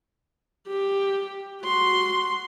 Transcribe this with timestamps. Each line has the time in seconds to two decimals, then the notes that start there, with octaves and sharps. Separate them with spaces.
0.68 G4
1.63 F#4 C6